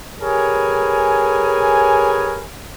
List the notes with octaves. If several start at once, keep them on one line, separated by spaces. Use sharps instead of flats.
G4 G#4 A#4 B4 C#5 G#5